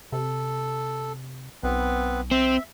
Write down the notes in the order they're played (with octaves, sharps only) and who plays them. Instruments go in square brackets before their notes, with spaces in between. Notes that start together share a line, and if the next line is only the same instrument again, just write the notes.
[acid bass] C3 [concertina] A4
[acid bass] B1 [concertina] B3 C4 B4
[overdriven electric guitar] C4 [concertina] E5